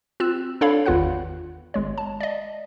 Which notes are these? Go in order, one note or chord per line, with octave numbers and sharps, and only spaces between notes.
C4 F4 E6 F#6 E7
D4 A4 C#5 D5 F5 B5
G#1 E2 F4 B4 F#5 F#6
G#1 G#3 C#5
A5
D5 D#5